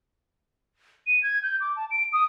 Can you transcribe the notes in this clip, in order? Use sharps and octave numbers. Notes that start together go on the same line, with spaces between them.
D#7
G#6
G6
D6
A5
D7
D#6